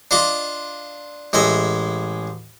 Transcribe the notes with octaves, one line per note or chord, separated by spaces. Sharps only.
D4 F4 D#5 D6
A1 G#3 D#5 E5